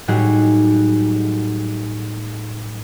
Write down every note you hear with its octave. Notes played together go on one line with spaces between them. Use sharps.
A2 F#3 G3 D#4 F#4 G#4